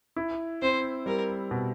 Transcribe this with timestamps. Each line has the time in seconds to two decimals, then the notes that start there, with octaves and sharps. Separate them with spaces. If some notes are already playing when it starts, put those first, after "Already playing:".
0.16 E4
0.62 C4 C5
1.06 G3 A#4
1.51 B2